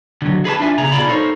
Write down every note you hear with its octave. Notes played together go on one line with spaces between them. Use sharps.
D3 F#3
G#4 B4 C#5 A5
D4 F4 E5 G#5
C#3 B3 G#4 A#5
B2 F4 G#4 D5 A5 B5
D#4 A4 A#4 C5 C#5